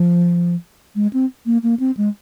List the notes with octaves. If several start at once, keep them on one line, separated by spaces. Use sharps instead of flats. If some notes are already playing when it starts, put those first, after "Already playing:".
Already playing: F3
G#3
C4
A#3
A#3
C4
G#3